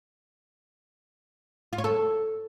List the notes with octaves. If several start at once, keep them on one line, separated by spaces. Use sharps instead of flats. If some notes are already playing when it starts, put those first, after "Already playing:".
F4
C#5
A4